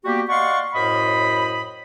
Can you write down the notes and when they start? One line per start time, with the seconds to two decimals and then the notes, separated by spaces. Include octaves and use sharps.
0.05 G3 A#3 B3 F#4 G4
0.29 D5 D#5 F5 F#5 C6 C#6
0.74 F#2 A2 C5 D#5 B5